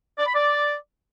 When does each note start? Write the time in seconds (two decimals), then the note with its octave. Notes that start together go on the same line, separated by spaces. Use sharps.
0.18 D5
0.27 B5
0.35 D5